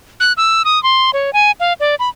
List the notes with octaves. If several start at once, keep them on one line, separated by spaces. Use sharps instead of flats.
F#6
E6
D#6
C6
C#5
G#5
F5
D5
B5